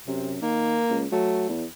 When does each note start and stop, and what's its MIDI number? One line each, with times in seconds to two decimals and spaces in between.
0.07 0.38 42
0.07 0.35 48
0.42 0.79 51
0.42 1.02 58
0.90 1.06 37
1.12 1.46 54
1.12 1.49 57
1.49 1.65 40